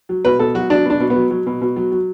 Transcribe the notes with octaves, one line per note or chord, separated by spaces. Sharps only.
F#3
B2 B4
B2 A4
F#3 F#4
F#3 D4
B2 D4
B2
B3
F#3
F#3
B2
B2
F#3
F#3